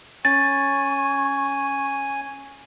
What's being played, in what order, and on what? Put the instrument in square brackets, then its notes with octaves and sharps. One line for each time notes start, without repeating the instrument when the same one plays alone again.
[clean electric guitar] C#4 [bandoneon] G#5 [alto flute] C#6 [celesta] A6